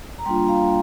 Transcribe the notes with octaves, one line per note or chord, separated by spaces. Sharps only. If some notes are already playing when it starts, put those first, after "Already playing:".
A#5
G3 A#3 D4 F4 G5 C6
F5 A#5